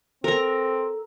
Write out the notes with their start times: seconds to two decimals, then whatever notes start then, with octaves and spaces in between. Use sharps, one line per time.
0.24 C4 A4 A#4 A#5